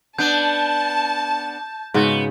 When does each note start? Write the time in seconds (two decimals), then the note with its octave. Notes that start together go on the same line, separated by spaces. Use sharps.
0.18 B3 D4 A5 G6
1.94 G#2 C#3 B3 F#4